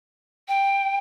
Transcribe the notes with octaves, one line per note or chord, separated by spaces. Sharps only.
G5